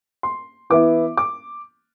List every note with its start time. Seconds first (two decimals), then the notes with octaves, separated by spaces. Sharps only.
0.23 C6
0.70 E3 B3 E4 D6
1.17 D6